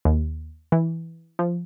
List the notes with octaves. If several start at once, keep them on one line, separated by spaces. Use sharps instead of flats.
D#2
E3
F3